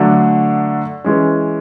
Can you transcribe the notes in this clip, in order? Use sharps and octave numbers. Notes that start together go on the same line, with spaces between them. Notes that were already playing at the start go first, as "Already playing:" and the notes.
Already playing: D3 F#3 A3 D4
E3 G#3 C#4